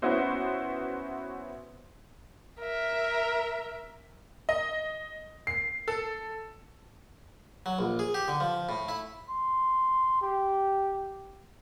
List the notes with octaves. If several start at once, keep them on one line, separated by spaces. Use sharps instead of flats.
B3 C#4 E4 F#4 C5
A#4 E5
D#5
C7
A4
F#3
A#1
G#4
G4
D3
F3
A2
E4
C6
G4